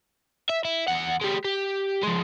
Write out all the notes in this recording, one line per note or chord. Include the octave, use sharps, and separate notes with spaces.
E5
E4
E2 F#5
G#3 G4
G4
F3 G#3